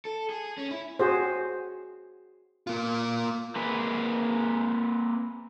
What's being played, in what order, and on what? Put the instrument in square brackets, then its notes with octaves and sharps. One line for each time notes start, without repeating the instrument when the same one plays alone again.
[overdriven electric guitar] A4
G#4
C#4
E4
[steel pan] F#4 G#4 C5
[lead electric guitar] A#3 F4
[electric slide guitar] A#3 C4 G#4 B4